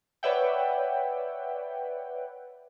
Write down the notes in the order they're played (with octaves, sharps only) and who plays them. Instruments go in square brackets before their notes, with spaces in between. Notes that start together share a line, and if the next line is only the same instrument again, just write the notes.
[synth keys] B4 C#5 D5 E5 F#5 G5